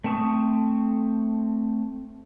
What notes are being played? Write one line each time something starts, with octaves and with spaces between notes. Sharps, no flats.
A3 C4 A5 C#6 D#6